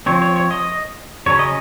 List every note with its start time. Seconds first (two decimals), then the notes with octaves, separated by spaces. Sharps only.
0.06 F3 C4 C#5
0.22 C#5
0.36 C#5
0.51 D#5
1.26 C#3 F#3 C#4 C#5
1.39 D#5